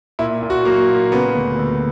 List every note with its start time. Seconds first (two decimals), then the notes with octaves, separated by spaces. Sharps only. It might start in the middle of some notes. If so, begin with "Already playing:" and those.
0.19 A#2 E4
0.43 A#2
0.50 F#4
0.65 F#3 A#3
0.89 A#2
1.12 C#3 B3
1.35 D2
1.59 D2